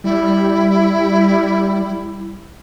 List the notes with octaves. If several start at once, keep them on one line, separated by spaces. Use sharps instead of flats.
G3 E4